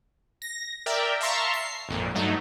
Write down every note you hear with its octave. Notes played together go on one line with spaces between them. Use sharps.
A#6
A#4 D5 E5 G5
E5 F5 A5 A#5 C6 C#6
C7
G#1 F2 A#2
G2 F#3 A3 D#4